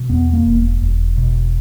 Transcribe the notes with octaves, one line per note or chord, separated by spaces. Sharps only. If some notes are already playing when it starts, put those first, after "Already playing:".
Already playing: B2
E2 B3
A#3
E1
E1
B2